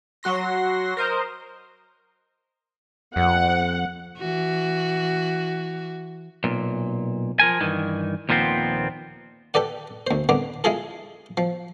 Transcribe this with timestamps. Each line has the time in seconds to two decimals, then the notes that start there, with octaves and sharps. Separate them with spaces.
0.23 F#3 F#4 C6 A#6
0.97 A#4 C5 D#5
3.16 F2 F#5
4.18 E3 F#4
6.44 B1 A#2
7.40 F3 A#4 G#5
7.60 G2 D#3 E3
8.29 D#2 A#2 F3 B3 C4
9.54 G4 A4 B4 D5 F#5
10.07 D2 C5
10.29 C2 D3 B3 D6
10.64 G#3 E4 F4 G#4 A4
11.37 F3